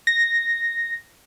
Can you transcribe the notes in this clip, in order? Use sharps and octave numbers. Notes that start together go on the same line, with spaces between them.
A#6